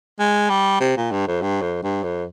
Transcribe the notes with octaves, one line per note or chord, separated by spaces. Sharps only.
G#3
G3
C3
A#2
G2
F2
G2
F2
G2
F2